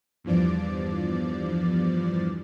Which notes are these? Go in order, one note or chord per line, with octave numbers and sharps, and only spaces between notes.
E2 G2 F3 D5